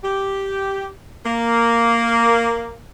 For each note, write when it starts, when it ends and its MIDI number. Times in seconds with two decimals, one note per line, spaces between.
0.03 0.87 67
1.25 2.80 58